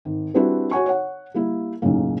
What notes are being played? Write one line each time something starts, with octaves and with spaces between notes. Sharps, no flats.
G#1
G3 C4 D4 E4 F#4 B4
F#4 C#5 F#5 G#5 C#6
C#5 F#5
G3 A#3 E4
B1 F#2 A2 C#3 A#3